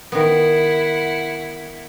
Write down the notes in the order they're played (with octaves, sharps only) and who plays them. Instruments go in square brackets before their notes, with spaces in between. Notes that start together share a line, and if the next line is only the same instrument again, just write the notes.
[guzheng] D#3 B3 [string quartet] E4 F#5